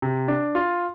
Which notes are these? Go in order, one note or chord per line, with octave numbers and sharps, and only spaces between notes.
C3
D4
F4